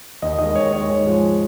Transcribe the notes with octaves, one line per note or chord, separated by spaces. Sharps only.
D#2 D#5
D#3 G#3 D#5
D#2 C#5
D#3 G#3 C#5
G#2 C#5
F3 G#3